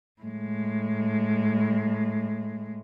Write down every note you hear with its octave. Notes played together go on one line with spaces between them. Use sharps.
A2 G#3